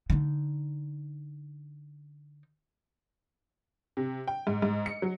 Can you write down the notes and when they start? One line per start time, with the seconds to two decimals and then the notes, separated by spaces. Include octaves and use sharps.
0.10 D3 D#4
3.97 C3
4.28 G5
4.47 G#2
4.62 G#2
4.86 C#7
5.02 F#3